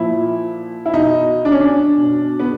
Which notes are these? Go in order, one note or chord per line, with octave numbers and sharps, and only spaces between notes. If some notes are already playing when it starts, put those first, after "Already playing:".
Already playing: A#2 F3 E4
E4
B2 D#4
D4
C#4
D4
B2
B3